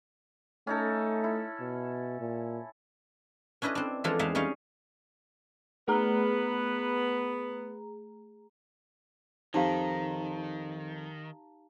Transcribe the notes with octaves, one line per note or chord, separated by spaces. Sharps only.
A3 C#4 D#4 A4
E4
B2
A#2
C#4 D4 E4 B4 D#5
C4 D4
E3 F3 G#3 D4 F4 A4
E2 G#3 D#4 E5 F5
G3 C#4 D#4 C#5 F5
A3 B3 G#4 B4 A#5
F2 D#3 D#4 G4 F5 A5 A#5